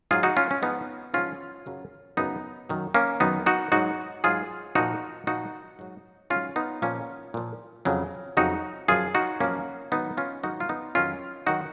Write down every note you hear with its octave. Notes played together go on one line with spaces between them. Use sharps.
G#2 F#3 F4 G#4
D#4 F#4
C#4 F4
C#4
G#2 F3 B3 D#4
G#2 F3 C#4 F4
F#2 C#3 F#3
F#2 C#3 F#3 B3 D#4
F#2 D#3 F#3
A#3 C#4
F#2 D#3 F#3 B3 D#4
D#4 F#4
G#2 F#3 D#4 F#4
G#2 F#3 F4 G#4
A#2 F3 D#4 F#4
A#2 F3 D#4 F#4
G#2 F#3
G#2 F#3 C#4 F4
B3 D#4
A#2 F3 A#3 C#4
A#2 F3
F2 C#3 F#3
F2 C#3 F#3 D#4 F#4
F#2 F3 F4 G#4
D#4 F#4
F#2 F3 A#3 C#4
G#2 D#3 F#3 B3 D#4
C#4 F4
G#2 D#3 F#3 D#4 F#4
F4
B3 D#4
F2 D#3 F#3 C#4 F4
D#3 F#3 D#4 F#4